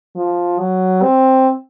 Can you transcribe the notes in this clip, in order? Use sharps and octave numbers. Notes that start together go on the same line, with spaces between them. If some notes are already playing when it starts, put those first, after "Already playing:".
F3
F#3
C4